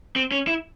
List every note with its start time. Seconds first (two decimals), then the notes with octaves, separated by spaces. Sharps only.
0.16 C4
0.31 C#4
0.47 E4